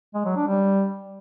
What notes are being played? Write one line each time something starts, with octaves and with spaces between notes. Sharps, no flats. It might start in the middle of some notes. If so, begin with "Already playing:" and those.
G#3
F#3
D4
G3